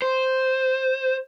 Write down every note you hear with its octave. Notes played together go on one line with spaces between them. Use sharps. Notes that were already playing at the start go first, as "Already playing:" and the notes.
C5